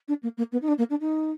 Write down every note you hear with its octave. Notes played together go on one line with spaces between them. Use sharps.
D4
A#3
A#3
B3
D#4
D4
A#3
D4
D#4